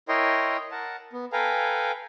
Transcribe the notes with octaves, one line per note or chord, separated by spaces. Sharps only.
E4 A#4 C#5 D#5 G5 C6
A#4 F#5 A5
B3
A4 B4 F5 G5 G#5 A#5